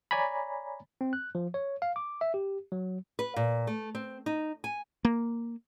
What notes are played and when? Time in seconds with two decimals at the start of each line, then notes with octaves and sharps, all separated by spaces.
0.11 C#5 D5 G#5 A#5 B5
1.01 C4
1.13 F#6
1.35 F3
1.54 C#5
1.82 F5
1.96 D6
2.21 E5
2.34 G4
2.72 F#3
3.19 B4
3.36 A#2
3.67 A3
3.95 C4
4.26 D#4
4.64 G#5
5.05 A#3